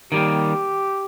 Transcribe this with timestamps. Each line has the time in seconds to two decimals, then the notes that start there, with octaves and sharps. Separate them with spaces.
0.12 D#3 G3 A#3 G4